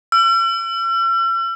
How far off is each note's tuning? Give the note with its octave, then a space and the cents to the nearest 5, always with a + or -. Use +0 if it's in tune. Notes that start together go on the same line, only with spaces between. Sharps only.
E6 +45